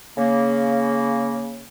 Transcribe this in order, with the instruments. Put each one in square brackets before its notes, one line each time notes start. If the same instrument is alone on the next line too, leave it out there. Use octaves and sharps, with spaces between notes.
[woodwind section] C#3 A#3